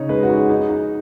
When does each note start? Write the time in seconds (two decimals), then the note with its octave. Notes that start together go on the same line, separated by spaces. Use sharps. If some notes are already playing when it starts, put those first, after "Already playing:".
Already playing: C#3 D#4 C#5
0.09 G#3 B4
0.23 F#4
0.29 D#4
0.36 G#4
0.50 D#4
0.69 D#4